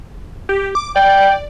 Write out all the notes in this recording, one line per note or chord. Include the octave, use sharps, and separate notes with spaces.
G4
D6
D5 G5